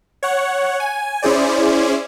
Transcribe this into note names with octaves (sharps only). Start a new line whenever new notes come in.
C#5 F#5
G#5
C#4 E4 G#4 C5 D5